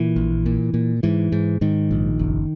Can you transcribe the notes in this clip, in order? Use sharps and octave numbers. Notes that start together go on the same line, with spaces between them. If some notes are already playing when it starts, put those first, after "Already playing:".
Already playing: A#2 E3
A#1
A#2
A#2
G#2 E3
G#2
G#2 D#3
A#1
F#1